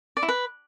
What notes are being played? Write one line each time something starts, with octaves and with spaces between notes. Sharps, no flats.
D5
E4
B4